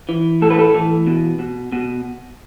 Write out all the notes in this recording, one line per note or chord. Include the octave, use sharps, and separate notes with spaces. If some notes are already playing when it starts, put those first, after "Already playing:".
E3
A2 A4
B4
A4
E3
B2
B2
B2